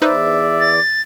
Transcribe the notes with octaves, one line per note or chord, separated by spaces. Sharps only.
E2 D#4 B4 C5 D5 E5
A6